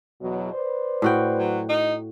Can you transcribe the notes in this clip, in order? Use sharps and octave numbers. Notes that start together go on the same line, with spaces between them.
E2 B2 F#3
B4 C5 D5
A2 F#4 G5
F#3
D#4